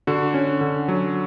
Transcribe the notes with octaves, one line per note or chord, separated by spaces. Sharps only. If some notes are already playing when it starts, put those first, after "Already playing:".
D3 F#4
C#4
D3
F#3